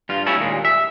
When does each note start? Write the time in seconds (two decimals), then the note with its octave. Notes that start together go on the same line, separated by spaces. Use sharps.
0.09 G2 F4
0.26 G3 A3 C#4 E4 A4
0.40 D#2 A#2 G#3
0.65 E5